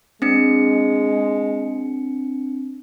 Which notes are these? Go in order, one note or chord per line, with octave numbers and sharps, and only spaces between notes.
G#3 C4 D4 C#7